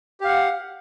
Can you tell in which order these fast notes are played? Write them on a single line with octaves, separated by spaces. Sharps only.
G4 F5 F#5